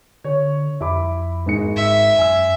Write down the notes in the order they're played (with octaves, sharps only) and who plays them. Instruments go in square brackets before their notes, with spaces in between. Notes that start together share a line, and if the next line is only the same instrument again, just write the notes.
[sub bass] D3 [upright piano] C#5
[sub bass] F2 [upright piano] E4 B5 D6
[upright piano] G#1 G#3 C#7
[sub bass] G#2 [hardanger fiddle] E5
[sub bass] F#2 [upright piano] G#5 E6